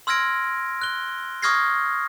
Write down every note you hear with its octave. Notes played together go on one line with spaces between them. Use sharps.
C6 E6 F6 G#6 A#6 D7
F#6 G7
C#6 D#6 F6 G#6 A#6 C7